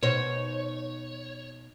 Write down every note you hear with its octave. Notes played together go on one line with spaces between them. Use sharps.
B2 D#4 C5 C#5